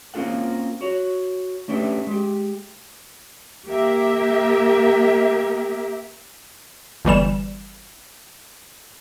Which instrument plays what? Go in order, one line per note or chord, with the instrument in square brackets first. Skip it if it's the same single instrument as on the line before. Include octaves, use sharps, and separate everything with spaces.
[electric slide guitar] A#3 C4 C#4 F4 A4 F#5
F#4 C#5
A3 C#4 D4 G4 B4 E5
G#3 G4
[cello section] A#3 G4 A#4 E5
[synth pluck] G1 E3 G3 E7